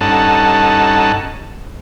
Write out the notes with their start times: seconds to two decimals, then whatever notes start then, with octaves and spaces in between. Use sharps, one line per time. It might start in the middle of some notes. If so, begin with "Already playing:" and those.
0.01 G2 C#4 D#4 A4 F#5 A5